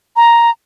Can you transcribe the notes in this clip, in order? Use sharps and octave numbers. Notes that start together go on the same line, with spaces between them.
A#5